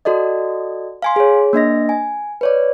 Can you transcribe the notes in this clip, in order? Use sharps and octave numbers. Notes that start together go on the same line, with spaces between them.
F#4 A4 D5 D#5
F5 G#5 C6
G#4 C#5
A#3 D4 D#5 A#6
G#5
B4 C#5 D5